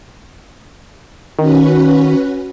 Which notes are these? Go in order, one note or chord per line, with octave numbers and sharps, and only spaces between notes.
D#3 C#4 F#4 B4